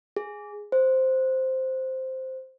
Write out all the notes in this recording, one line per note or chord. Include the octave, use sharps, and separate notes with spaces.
G#4
C5